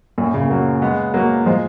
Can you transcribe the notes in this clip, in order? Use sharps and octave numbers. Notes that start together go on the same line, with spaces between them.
F#2 A#2
A#2 C#3
F#3 A#3
G#3 B3
F#3 A#3
F3 G#3